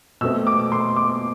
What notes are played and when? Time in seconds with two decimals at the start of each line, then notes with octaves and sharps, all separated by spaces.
0.21 B2 A3 C4 E6
0.47 D6
0.72 C6
0.96 D6